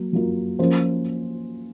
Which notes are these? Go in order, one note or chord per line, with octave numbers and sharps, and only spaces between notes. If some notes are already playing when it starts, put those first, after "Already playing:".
Already playing: F#3 A#3
F#3 A#3 F4
F3 A#3 C#4 F4 C5